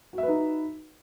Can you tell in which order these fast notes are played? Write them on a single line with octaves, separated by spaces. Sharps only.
F#4 E5 B4 D#4